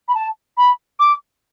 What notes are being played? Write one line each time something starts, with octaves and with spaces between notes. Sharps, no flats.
B5
A5
B5
D6